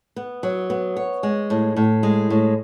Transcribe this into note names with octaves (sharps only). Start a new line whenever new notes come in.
B3
F#3
B3
C#5
G#3
A2
A2
G#3
A2